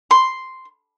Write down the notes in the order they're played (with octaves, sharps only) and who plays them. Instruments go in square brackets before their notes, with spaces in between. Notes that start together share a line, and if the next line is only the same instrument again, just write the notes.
[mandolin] C6